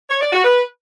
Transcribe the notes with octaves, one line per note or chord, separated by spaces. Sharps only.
C#5
D5
F#4
B4